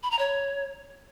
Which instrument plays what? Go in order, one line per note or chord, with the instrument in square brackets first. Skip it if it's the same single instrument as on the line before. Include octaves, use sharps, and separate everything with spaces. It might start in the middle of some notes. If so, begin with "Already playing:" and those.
[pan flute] B5
A#5
C#5